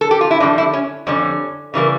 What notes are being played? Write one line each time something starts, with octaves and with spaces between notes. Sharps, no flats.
A4
G4
F4
E4
F2 D3 G3 D4
E4
C#4
F2 D3 G3 C#4
C#3 E3 G3 A#3